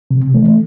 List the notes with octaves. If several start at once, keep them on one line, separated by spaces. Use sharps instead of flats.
C3
E3 A3